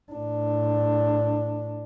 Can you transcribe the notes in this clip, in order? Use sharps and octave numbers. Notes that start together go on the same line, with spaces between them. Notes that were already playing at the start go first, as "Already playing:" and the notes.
A2 D4